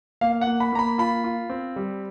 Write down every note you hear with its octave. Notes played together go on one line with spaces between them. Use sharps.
A#3 F5
F5
F#5
A#3
B5
A#3 A#5
B5
F4 B5
F4
C4
G3